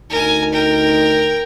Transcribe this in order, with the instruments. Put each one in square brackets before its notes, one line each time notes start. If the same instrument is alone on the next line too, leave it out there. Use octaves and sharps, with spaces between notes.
[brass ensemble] D2 D#4 [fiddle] A#4 G#5
[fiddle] A#4 G5